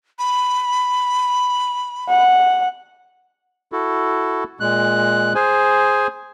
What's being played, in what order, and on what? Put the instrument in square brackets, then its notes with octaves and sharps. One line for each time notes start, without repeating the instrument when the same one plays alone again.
[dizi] B5
[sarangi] F#5
[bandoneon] E4 F#4 A4
A#2 G#3 F#6
G#4 C5 G#5